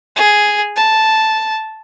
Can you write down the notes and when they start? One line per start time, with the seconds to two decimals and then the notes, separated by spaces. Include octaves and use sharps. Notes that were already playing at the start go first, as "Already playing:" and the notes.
0.16 G#4
0.76 A5